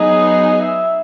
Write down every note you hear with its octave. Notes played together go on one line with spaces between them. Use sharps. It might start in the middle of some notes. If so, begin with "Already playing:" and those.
Already playing: F#3 B3 D#4 G#4 D#5
E5